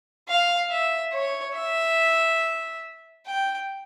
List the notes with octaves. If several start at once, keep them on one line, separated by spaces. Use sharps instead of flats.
F5
E5
C#5
E5
G5